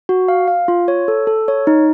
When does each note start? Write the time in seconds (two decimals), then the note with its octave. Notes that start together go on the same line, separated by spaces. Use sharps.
0.09 F#4
0.28 F5
0.48 F5
0.68 F4
0.88 C#5
1.08 A4
1.27 A4
1.48 C#5
1.67 D#4